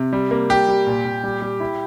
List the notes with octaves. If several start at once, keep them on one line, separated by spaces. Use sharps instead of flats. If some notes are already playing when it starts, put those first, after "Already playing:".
Already playing: C3
G3
A#3
G3 G4
G3
A#2
A#2
G3
G3
E4